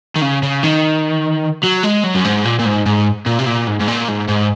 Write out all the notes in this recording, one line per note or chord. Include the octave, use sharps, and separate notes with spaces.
D#3
C#3
C#3
D#3
F#3
G#3
F#3
F#2
G#2
A#2
A#2
G#2
G#2
A#2
C3
A#2
G#2
G#2
A#2
G#2
G#2